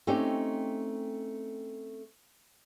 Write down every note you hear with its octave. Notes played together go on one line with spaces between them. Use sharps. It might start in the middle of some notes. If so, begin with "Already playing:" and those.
A3 C4 C#4 D#4 G4